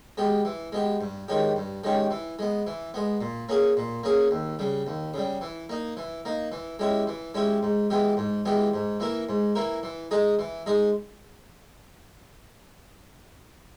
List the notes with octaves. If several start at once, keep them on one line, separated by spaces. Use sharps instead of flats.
G#3 B3 G4
E3
G#3 B3 G4
G2
D#3 G#3 C#4 G4
G2
D#3 G#3 C#4 G4
E3
G#3 B3
E3
G#3 B3
A#2
A#3 C#4 G#4
A#2
A#3 C#4 G#4
D#2
C#3 G3
D#2
C#3 G3
E3
A#3 D#4
E3
A#3 D#4
E3
G#3 C#4 E4 G4
E3
G#3 C#4 E4 G4
G#2
E3 G#3 B3 G4
G#2
E3 G#3 B3 G4
G#2
E3 A#3 E4 A#4
G#2
E3 A#3 E4 A#4
E3
G#3 D#4 G#4
E3
G#3 D#4 G#4